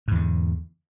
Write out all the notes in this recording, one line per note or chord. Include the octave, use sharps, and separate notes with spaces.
E2 G#2 D3